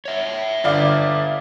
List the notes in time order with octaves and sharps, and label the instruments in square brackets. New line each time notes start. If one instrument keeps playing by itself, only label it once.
[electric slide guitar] C#5 E5
[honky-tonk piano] G1 D5 F5